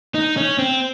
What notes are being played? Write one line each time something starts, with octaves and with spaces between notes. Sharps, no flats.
D#4
C#4
C4